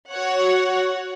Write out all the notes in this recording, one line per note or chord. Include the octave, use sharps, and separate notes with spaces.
F#4 C#5 F#5